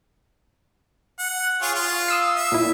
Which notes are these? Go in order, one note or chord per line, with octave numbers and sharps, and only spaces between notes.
F#5
F4 G#4 C#5
F4
D#6 E6 C7
E5
A#2 E4